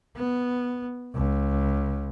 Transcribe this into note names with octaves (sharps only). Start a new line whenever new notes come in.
B3
C#2